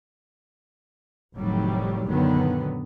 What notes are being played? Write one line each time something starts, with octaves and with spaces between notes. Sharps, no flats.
F1 A2 D#3 F#3 G3
A#1 F#2 D3 D#3 F#3 B3